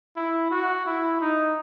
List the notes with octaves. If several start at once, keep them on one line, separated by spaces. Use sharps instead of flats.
E4
F#4
E4
D#4